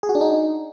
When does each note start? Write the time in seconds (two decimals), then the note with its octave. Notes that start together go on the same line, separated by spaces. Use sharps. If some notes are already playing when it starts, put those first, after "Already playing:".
0.03 G#4
0.09 F#4
0.15 D4
0.21 D#4